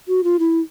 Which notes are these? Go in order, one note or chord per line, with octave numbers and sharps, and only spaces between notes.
F#4
F4
E4